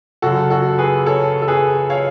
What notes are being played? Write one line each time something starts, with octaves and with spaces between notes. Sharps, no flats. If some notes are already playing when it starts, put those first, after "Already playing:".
F#2 C#3 F#4 A4
F#4 A4
G#4 B4
A4 C#5
A4
G#4 B4
C#5 F5